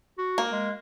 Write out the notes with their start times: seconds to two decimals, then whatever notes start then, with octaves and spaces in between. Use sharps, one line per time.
0.18 F#4
0.38 A#3
0.52 G#3